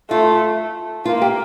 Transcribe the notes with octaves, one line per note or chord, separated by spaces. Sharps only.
A3 F4
A#3 F4
G4